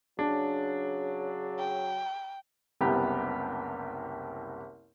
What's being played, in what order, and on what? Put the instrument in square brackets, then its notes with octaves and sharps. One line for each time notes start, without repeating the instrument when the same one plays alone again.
[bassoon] C#3 [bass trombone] F#3 [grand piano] D4
[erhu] G5
[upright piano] F#1 C2 C3 B3 G4